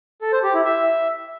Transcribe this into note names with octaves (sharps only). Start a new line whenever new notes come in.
A4
C5
G4
E4
E5